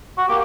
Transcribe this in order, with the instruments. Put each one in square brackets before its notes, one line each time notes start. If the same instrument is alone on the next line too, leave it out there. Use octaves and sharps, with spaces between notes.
[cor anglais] F#4
[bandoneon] A#3 [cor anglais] G4